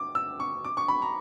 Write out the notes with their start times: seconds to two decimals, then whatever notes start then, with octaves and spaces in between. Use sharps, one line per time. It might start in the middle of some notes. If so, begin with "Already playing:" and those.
Already playing: D6
0.15 E6
0.40 C#6
0.65 D6
0.77 C#6
0.88 B5
1.02 A#5